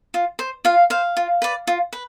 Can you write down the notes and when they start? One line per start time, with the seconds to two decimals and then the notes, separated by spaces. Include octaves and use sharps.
0.14 F4
0.39 C5
0.65 F4 F5
0.90 C5 F5
1.17 F4
1.42 B4 D5
1.67 F4
1.93 B4